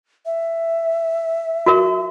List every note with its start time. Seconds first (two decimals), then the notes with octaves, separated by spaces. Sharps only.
0.26 E5
1.66 F#4 A#4 C#6